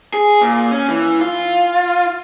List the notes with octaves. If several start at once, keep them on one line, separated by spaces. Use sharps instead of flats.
G#4
A#2
C#4
E3
F4